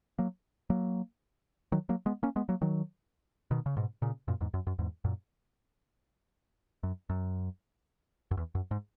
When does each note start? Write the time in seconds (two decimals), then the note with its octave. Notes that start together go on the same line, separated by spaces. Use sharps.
0.19 F#3 A#3
0.70 F#3 A#3
1.72 D#3 F#3
1.89 F#3 A#3
2.06 G#3 B3
2.23 A#3 C#4
2.36 G#3 B3
2.49 F#3 A#3
2.62 D#3 F#3
3.51 B2 D#3
3.66 C#3
3.77 G#2 B2
4.02 A#2 C#3
4.28 F#2 A#2
4.41 E2 G#2
4.54 F#2
4.67 F#2
4.79 E2 G#2
5.04 F#2 A#2
6.83 F#2
7.10 F#2
8.31 F#2
8.37 E2
8.55 F#2
8.71 G#2